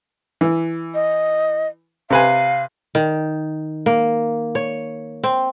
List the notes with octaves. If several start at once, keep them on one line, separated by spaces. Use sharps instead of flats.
E3
D#5
C3 B4 F5 G#5
D#3
A#3
C#5
C4